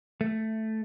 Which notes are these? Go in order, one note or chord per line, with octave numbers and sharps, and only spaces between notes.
A3